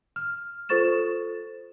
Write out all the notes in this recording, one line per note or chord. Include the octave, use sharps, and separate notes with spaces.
F6
F4 A4 C5 C#6 A6 E7